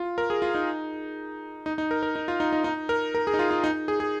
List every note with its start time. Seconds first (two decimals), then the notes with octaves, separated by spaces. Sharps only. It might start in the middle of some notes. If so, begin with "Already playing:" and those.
Already playing: F4
0.18 A#4
0.30 G#4
0.42 F4
0.55 D#4
1.66 D#4
1.78 D#4
1.91 A#4
2.03 A#4
2.16 D#4
2.28 F4
2.40 D#4
2.53 D#4
2.64 D#4
2.89 A#4
3.15 A#4
3.27 G#4
3.34 D#4
3.39 F4
3.51 F4
3.64 D#4
3.88 G#4
4.00 G#4